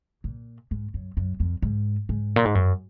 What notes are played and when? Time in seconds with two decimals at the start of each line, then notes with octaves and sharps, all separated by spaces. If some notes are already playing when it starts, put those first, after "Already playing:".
0.24 A#2
0.71 G#2
0.94 F#2
1.17 F#2
1.40 F2
1.62 G#2
2.09 G#2
2.36 A#2
2.45 G#2
2.55 F#2